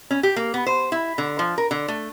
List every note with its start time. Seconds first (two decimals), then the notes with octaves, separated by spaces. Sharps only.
0.11 C#4
0.23 G4
0.36 A#3
0.54 B3
0.67 C5
0.92 E4
1.18 D3
1.39 F3
1.58 A#4
1.71 D3
1.88 A3